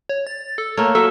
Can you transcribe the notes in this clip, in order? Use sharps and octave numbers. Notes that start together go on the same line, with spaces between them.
C#5
A6
A4
A3 A#3 C#5
F#3 A4 E5